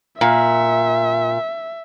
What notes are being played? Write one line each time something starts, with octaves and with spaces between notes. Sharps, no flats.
A#2 E5